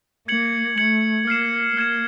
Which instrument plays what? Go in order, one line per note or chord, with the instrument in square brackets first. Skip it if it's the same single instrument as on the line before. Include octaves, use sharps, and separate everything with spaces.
[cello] A#3 [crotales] G#6 C#7 F#7
[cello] A3 [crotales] G#6 C#7 F#7
[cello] A#3 [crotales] F6 G#6 C7 E7
[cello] A#3 [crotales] F6 G#6 C7 E7